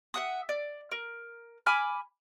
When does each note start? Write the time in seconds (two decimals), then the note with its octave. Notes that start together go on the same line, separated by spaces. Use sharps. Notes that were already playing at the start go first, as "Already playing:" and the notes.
0.14 E5 F#5 D#6
0.49 D5
0.91 A#4
1.66 G#5 B5 D6 F6